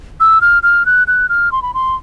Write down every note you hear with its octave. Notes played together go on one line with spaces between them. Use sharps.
E6
F6
F6
F#6
F#6
F6
C6
B5
C6